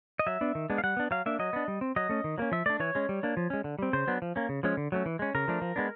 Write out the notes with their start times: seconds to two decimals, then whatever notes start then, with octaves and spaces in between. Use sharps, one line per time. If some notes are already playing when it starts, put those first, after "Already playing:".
0.19 D#5
0.27 F#3 E5
0.41 B3 D4
0.55 D#3
0.70 G#3 B3 D4
0.78 F5
0.84 G3 F#5
0.97 B3 D4
1.11 F#3 F5
1.26 A#3 D4 E5
1.39 F#3 D#5
1.53 B3 D4
1.68 G3
1.81 C4
1.96 F#3 D#5
2.09 A3 C#4
2.24 D#3
2.38 F#3 A#3 C#4
2.52 F3 E5
2.66 A3 D4 D5
2.80 E3 C#5
2.95 G#3 C#4
3.09 G3
3.23 A#3 D4
3.37 F3
3.50 G#3 C#4
3.64 D3
3.79 G3 C4
3.93 C#3 C5
4.07 F#3 B3 D4
4.22 F3
4.36 A#3 C#4
4.49 C#3
4.63 F3 G#3 C#4
4.77 D3
4.92 F#3 A3 C#4
5.06 E3
5.19 G#3 C#4
5.35 C#3 A#4
5.48 F3 A3 D4
5.62 F3
5.76 G#3 B3 D4